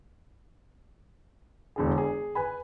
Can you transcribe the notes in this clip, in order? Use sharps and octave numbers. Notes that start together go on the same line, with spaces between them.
E1 D3 G#4
G#4
B4 G#5 B5